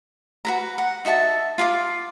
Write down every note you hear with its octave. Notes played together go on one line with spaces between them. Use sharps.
F#4 B4 A#5
F#5
D#4 F#4 E5 A5
F4 F5 G#5 D6